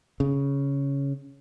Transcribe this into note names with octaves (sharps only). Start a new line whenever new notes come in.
C#3